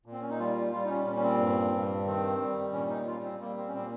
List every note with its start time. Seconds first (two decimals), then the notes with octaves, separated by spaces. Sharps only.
0.06 A#2
0.12 C4
0.21 C#4
0.30 D#4
0.39 G3 F4
0.73 G3 F4
0.84 D#4
0.89 C#4
1.06 A#2 C#4
1.16 C#4
1.23 C4
1.39 G2
1.73 G2
2.06 D#3 C4
2.40 G3
2.73 A#2 C#4
2.90 D#4
3.07 G3 F4
3.23 C4
3.40 G3 A#3
3.57 C4
3.67 C#4
3.74 A#2 C4